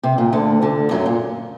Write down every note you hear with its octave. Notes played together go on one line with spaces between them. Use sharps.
C3
A#2
D2 D3
D2 D3
F#2 F#3
A#2